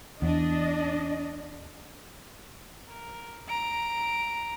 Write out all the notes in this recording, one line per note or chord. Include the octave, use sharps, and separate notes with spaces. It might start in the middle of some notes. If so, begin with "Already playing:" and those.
E2 D4 D#5
A#4
A#5 D7